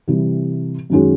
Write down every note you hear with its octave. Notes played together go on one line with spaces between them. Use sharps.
C3 E3 G3
F#2 D#3 G#3 C#4 F#4